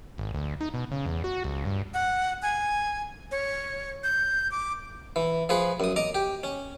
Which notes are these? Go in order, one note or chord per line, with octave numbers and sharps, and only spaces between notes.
G#1
D2
D#4
B2
C#3
E2
F#4
C#2
G2
F#5
G#5
C#5
G6
D6
E3
F3 G#4 B4
F#2 D#6
D#5 A#5 D6 D#6
G4
C#4